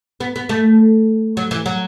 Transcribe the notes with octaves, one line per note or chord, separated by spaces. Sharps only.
B3
B3
A3
F#3
E3
F#3